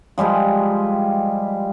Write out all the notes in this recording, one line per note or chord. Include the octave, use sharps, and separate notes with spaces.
F3 G3 G#3 B4